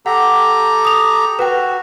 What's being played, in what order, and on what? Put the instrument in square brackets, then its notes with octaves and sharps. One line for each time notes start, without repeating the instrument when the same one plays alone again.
[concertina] G4 A4 A#5 [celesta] F#5
[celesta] D#6 F7
[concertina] F#4 [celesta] B4 G5